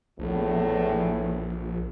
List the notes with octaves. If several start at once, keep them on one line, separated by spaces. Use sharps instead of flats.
A#1 E2 A2